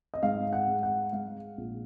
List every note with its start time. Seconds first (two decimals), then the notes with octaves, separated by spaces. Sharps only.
0.14 D#5
0.23 G#2 F5
0.53 F#5
0.68 G#3
0.83 F#5
1.12 G#3 F5
1.57 A#1